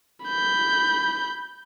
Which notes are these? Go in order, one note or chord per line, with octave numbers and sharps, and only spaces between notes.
B5 G6